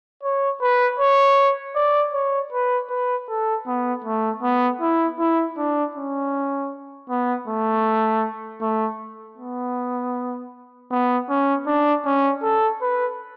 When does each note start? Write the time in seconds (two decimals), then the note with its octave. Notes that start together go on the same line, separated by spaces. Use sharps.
0.24 C#5
0.62 B4
1.00 C#5
1.75 D5
2.14 C#5
2.53 B4
2.90 B4
3.29 A4
3.67 B3
4.05 A3
4.43 B3
4.81 E4
5.19 E4
5.58 D4
5.95 C#4
7.10 B3
7.48 A3
8.62 A3
9.38 B3
10.91 B3
11.30 C#4
11.67 D4
12.06 C#4
12.43 A4
12.82 B4